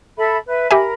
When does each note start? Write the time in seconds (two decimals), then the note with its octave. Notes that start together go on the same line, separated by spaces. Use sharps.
0.17 A4 E5 B5
0.48 B4 E5
0.71 G4 A#4 E5 G#5 B5